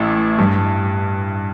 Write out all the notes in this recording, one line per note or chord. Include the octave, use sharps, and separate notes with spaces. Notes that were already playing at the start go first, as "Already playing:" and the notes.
Already playing: A1 A2
G2